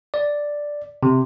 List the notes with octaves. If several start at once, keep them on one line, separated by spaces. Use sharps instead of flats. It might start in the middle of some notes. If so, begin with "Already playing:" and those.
D5
C3